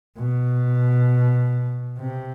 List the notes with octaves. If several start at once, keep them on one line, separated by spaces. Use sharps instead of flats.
B2
C3